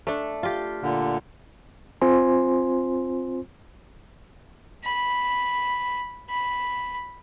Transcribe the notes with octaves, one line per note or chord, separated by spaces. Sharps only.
A3 D4
F4 G4
A#2 D3
C4 F4 C5 G#5 C6
B5
B5